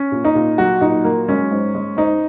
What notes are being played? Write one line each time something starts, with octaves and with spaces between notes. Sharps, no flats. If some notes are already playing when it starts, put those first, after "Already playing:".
Already playing: C#4
A#2
D#4
A#2
F#3 F#4
A#2 D#4
F#3 A#3
G#3 C#4
G#2
G#3
G#2 D#4